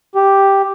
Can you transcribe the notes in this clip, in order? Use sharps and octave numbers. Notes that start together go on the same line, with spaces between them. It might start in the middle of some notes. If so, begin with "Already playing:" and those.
G4